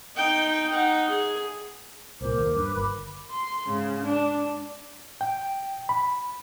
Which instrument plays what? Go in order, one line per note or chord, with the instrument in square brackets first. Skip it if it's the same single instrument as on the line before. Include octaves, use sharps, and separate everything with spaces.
[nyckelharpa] D#4 G5
D#4 F#5
G#4
[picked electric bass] C2 A#2 [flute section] A#4 D6 [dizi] C5
[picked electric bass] D#2
[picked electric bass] G2 [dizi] B4
[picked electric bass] G1 [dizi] B5
[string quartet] C6
G#2 C#3
D4
[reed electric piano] G5
B5